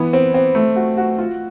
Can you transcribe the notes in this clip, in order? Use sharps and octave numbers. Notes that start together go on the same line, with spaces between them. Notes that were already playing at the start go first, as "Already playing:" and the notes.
Already playing: E3 B3
C4
C4
A3
F#4
F#4
F4